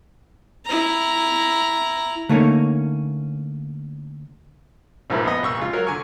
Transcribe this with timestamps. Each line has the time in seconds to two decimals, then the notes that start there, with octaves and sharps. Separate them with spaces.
0.65 E4 A#5
2.29 D3 A3 A#3 C#4 D#4 C#5
5.10 A#1 G#2 F3 A#3 E4 B4
5.25 B3 D#5
5.43 A#1 C#6 E6
5.57 C#3 G#3 F4
5.73 F#3 A#4 C#5
5.87 D3 G#5 C#6